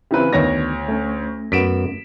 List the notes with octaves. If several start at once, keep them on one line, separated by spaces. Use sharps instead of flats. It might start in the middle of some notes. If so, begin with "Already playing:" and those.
C#3 E3 C4 E4 G4 B4
D2 D#3 B3 D4 C#5 A#6
A3 C#4
F#2 B3 B6 D7 E7